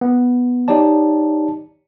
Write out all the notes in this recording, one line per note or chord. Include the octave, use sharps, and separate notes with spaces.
B3
D#4 G4 C#5 D5 A5